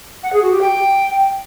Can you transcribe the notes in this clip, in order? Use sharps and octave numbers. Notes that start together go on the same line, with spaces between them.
F#5
G#4
F#4
G4
G5